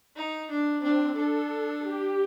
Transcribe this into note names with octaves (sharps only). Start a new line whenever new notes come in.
D#4
D4
C4 D4
D4 A4
G4